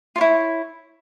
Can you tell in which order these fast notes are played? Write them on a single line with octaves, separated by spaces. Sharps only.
F4 C#5 E4